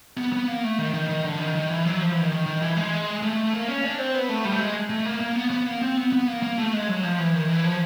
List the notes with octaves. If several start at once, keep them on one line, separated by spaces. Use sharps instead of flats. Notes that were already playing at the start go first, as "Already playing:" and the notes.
B3
B3
A#3
A3
D#3
D#3
D#3
D3
D#3
D#3
E3
F#3
F3
E3
D#3
D#3
D#3
E3
G#3
A3
A#3
C#4
D4
C4
B3
A3
G3
A3
G#3
A3
A#3
A#3
B3
B3
A#3
C4
B3
B3
A#3
A#3
A3
G#3
F#3
F3
E3
D#3
E3
F3